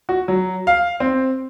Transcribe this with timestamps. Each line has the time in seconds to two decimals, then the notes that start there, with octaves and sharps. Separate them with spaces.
0.09 F#4
0.28 F#3
0.67 F5
1.00 C4